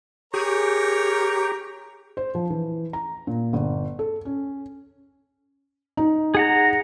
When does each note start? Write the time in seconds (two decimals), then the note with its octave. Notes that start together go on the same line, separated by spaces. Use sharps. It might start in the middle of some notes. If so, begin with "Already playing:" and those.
0.34 G4 G#4 A#4 C#5 A#5
2.17 C5
2.35 F3
2.50 E3
2.93 A#5
3.27 A#2
3.53 G1
3.99 A4
4.25 C#4
5.97 D#4
6.35 G#4 F#5 A#5